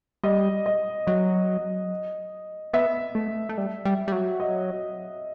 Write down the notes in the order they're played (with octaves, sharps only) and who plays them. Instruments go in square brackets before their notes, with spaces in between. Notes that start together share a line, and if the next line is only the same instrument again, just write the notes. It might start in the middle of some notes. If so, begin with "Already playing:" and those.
[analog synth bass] G3 [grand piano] D#5
[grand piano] D#5
[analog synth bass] F#3 [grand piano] D#5
[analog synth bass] B3 [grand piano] E5
[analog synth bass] A3
A3
G3
G3
G3
F#3
[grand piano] D#5